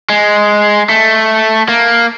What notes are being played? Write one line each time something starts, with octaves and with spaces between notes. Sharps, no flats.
G#3
A3
A#3